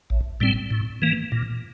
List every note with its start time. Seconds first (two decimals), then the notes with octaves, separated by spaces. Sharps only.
0.10 A1
0.40 A2 G3 C4
0.71 A2
1.02 E3 A#3
1.32 A#2